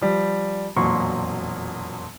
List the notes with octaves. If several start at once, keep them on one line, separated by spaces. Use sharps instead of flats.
F3 G3
E1 F2 A#2 F#3 C6 C#6